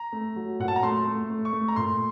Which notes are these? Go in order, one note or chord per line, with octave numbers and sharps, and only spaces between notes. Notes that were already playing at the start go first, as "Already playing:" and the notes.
Already playing: A#5
A3
F#3
A#2 F#5
A5
A#5
A3 C6
A3
A3
C#6
A3
A#5
A#2 C6